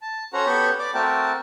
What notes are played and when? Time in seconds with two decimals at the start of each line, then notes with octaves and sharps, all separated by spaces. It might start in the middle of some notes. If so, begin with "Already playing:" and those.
0.02 A5
0.33 C#4 F#4 A4 C5 F#5 A#5
0.46 B3 G4 A4 C#5 B5 C#6
0.79 D5 D6
0.94 A3 C4 F#4 A#4 G5 A5